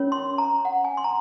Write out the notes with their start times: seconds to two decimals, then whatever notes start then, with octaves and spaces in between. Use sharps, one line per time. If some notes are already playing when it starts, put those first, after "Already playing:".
Already playing: C#4 F4 A#4 C#5
0.12 C6
0.38 A#5
0.65 F#5
0.85 G#5
0.97 C6
1.04 A#5